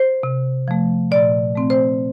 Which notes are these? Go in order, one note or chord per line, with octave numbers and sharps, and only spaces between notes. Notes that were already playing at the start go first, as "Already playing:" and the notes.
Already playing: C5
C3
F3 A3
A#2 D5
A3 C4
C5